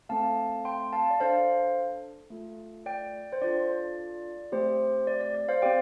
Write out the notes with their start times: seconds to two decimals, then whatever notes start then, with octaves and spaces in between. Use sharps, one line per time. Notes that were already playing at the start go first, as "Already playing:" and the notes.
0.09 A3 C4 A4 F5 A5
0.65 G5 C6
0.93 F5 A5
1.10 D5
1.20 D4 A4 C5 F5
2.30 A3 F4 A4
2.86 D5 G5
3.32 C5
3.41 D4 F4 A4 D5
4.52 A3 C4 G4 C5
5.07 D5
5.21 D5
5.35 D5
5.48 C5 F5
5.62 C4 G4 D5 G5